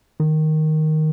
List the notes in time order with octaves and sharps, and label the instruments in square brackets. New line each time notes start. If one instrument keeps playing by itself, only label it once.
[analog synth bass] D#3